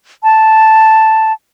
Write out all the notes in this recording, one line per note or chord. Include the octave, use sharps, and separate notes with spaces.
A5